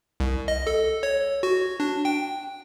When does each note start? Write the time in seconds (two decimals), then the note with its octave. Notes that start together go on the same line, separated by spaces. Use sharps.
0.20 C2
0.48 D#5
0.67 A4
1.03 C#5
1.43 F#4
1.80 D4
2.05 G5